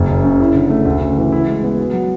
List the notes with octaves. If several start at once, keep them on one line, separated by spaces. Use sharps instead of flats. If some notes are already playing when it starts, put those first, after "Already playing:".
Already playing: F#1
F#2
C#3
E4
D3
A3
D2
C#3
E3
E4
G#3
B3
F#4
F#3